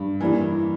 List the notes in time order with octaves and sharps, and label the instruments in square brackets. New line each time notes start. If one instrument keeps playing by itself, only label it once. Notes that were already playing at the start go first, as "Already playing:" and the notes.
Already playing: [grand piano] G2
[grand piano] E3 [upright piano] G3 A#3 E4